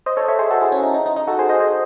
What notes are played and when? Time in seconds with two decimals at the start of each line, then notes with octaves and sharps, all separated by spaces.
0.06 C5 D#5
0.17 A4 C#5
0.28 C#5 E5
0.39 G#4 C5
0.50 F#4 A4
0.61 E4 G#4
0.72 C#4
0.83 D#4
0.94 D#4
1.06 D#4
1.16 D#4
1.27 F#4 A4
1.39 G#4 C5
1.49 C5 D#5
1.60 G#4 C5